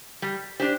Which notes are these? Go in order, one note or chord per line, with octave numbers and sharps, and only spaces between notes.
G3
D4 G4 C5